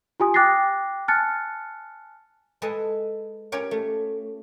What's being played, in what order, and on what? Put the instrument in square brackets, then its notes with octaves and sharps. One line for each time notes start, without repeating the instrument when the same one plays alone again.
[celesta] F4 G4 G#5 D#6
G5 D6 F#6 A6 A#6 C7
G#5 A5 F6 F#6 A6 C#7
[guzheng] G#3 A4 B4 D#5 E5
C#4 F4 G4 A#4 C#5
A3